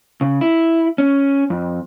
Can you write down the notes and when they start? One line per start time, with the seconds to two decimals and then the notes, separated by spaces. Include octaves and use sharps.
0.21 C#3
0.41 E4
0.98 C#4
1.50 F2